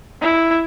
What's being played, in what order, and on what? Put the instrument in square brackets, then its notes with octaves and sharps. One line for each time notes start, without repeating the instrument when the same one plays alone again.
[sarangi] E4